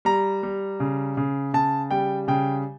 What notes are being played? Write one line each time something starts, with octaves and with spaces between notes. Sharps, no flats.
G3 A#5
G3
C#3
C#3
C#3 A5
G3 G5
C#3 G5